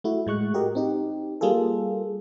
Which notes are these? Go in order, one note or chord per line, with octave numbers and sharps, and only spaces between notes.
A3 E4 F#4
A2 G#3 C#6 F#6
F#4 G4 A#4 D#5
C4 D#4 G4
G3 A#3 F4 G#4 A4